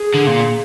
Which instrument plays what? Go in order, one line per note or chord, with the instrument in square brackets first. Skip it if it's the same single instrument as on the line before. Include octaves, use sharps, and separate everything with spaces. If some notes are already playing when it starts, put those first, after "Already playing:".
Already playing: [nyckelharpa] G#4
[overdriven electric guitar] D3
A#2